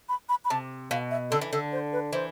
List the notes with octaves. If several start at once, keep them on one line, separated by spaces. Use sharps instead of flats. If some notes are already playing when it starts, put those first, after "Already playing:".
B5
B5
B5
C3 A5
B2 F5
E5
D3 A4
E3
D3 A4
C5
B4
E3 C5